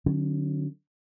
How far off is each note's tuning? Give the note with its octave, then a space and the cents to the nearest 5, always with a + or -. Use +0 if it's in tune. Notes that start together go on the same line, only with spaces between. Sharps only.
D3 +30 F#3 +0 C#4 -25